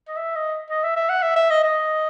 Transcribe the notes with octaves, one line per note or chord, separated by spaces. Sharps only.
D#5
E5
D#5
D#5
E5
E5
F#5
E5
E5
D#5
D#5